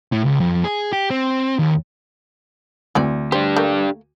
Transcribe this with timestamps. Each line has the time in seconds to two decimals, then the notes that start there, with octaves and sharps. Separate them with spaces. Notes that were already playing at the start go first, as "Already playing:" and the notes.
0.12 A2
0.25 C#2
0.40 F2
0.64 G#4
0.93 G4
1.10 C4
1.59 D#2
2.95 D2 E3 C4 D5
3.32 D4 G4 C5
3.56 A3 A#3